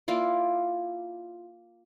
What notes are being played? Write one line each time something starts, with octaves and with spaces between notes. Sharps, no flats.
A#3 E4 F4 D5